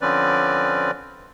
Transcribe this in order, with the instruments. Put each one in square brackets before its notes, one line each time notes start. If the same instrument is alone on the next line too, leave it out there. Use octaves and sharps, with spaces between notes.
[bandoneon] D3 F3 C4 C#4 B4 D5